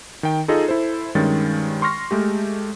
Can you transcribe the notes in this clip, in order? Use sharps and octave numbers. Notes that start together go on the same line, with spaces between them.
D#3 G5
D#4 F4 G#4 A4 D#5
E4 A4 C5
G2 D#3 G#3 C#4 A6
C6 C#6 F6 A#6
G#3 A3 G4